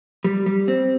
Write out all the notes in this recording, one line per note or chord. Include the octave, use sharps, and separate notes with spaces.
G3
G3
C4